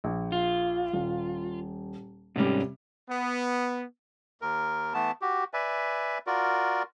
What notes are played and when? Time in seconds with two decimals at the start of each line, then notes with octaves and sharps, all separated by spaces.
0.04 A#1
0.32 F4
0.93 D#1
2.36 G#2 C3 G3 C#4
3.10 B3
4.41 D#2 A#4
4.94 E3 A3 B3 A5
5.22 F#4 G4
5.53 B4 D5 E5 G#5
6.27 F4 F#4 A#4 D5